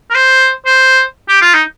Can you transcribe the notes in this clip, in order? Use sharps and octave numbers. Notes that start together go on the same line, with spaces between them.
A#4
C5
C5
G4
F4
D#4